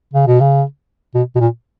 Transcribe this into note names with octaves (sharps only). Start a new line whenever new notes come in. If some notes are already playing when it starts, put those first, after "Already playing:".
C#3
B2
C#3
B2
B2
A#2